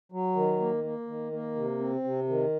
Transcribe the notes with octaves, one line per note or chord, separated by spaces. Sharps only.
F#3
D#3
A#3
A#3
D#3
A#3
C3
C4
C3
D#3